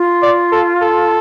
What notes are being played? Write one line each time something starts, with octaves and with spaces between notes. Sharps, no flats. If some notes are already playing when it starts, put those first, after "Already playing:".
Already playing: F4
D5
A4
A4